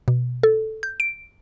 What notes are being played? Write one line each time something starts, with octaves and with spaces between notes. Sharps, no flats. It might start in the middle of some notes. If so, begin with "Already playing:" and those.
B2
A4
G6
D7